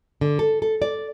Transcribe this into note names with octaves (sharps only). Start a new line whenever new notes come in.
D3
A4
A4
D5